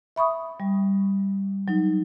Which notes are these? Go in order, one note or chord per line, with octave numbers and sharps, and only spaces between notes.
E5 B5 C#6 D#6
G3
F#3 D#4